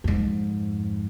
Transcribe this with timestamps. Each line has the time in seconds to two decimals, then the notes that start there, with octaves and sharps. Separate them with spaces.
0.04 F2 G#2